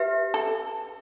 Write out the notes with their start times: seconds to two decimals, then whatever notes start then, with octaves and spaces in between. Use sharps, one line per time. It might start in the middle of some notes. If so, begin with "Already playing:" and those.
Already playing: G4 B4 E5
0.34 A4